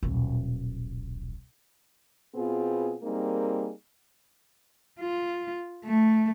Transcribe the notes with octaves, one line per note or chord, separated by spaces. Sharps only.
D#1 B1
B2 B3 C4 F4 G#4
G3 A#3 C4 D#4 G#4 A#4
F4
A3